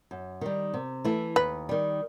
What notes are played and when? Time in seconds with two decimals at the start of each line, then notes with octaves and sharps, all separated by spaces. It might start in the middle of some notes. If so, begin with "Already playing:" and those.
0.11 F#2
0.41 D#3 G3
0.74 C3
1.05 E3 A3 E4
1.36 D#2 B4
1.69 D#3 G3